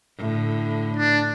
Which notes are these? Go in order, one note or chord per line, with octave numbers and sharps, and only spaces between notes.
A2 D3
D4